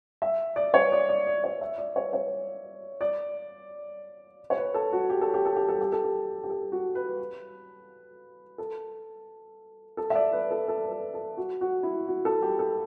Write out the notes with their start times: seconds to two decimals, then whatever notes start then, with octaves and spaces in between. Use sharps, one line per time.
0.22 E5
0.56 D5
0.74 C#5
0.92 D5
1.09 D5
1.27 D5
1.44 C#5
1.61 E5
1.78 D5
1.96 C#5
2.13 C#5
3.01 D5
4.50 C#5
4.57 B4
4.74 A4
4.93 F#4
5.10 G4
5.21 A4
5.34 G4
5.45 A4
5.56 G4
5.68 A4
5.81 G4
5.92 A4
6.04 G4
6.44 G4
6.50 A4
6.72 F#4
6.95 B4
8.58 A4
9.97 A4
10.10 E5
10.15 D5
10.32 B4
10.51 A4
10.68 A4
10.86 B4
10.91 A4
11.14 A4
11.37 F#4
11.61 F#4
11.83 E4
12.08 F#4
12.25 A4
12.42 G4
12.59 A4